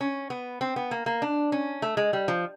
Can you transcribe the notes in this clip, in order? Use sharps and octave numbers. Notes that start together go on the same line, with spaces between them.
C#4
B3
C4
B3
A#3
A#3
D4
C#4
A3
G#3
G3
F3